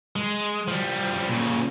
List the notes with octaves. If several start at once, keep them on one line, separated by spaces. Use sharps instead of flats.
G#3
F3 G3
A#2 C#3